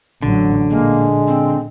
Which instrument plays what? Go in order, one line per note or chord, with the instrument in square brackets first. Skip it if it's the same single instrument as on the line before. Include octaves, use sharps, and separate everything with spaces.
[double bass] A1 F#3 [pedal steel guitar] D3
[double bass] A#2 [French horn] G#3 [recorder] A#3
[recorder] C4